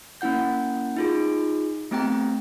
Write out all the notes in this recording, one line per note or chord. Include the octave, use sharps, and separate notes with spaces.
A#3 C#4 E4 F#5 G6
D#4 F4 G#4
A3 B3 C4 G4 G5 A#5